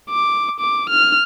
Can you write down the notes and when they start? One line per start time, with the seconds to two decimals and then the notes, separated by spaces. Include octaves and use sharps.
0.10 D6
0.60 D6
0.90 F6